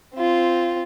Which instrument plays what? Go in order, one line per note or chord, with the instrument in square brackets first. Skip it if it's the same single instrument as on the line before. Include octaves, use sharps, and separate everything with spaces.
[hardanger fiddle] C4 F4